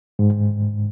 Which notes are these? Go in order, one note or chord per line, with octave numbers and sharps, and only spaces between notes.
G#2